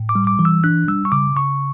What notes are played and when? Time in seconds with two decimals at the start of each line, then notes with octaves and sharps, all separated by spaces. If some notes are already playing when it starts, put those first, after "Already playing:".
Already playing: A2
0.09 D6
0.15 G3
0.27 D6
0.39 E3
0.45 E6
0.64 D4 F#6
0.88 G3 E6
1.05 C#6
1.12 C#3 D6
1.36 C#3 C#6